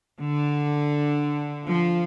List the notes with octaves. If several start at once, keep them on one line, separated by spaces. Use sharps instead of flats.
D3
F3